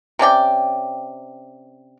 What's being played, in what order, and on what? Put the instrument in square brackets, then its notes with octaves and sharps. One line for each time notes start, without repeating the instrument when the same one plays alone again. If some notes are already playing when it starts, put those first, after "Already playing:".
[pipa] C3 C#4 D5 G5